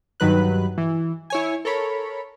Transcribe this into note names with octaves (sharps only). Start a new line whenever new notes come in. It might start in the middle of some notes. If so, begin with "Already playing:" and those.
G2 D#3 F#3 B4 F#6
E3
E4 C#5 G#5
A4 A#4 C#5 B5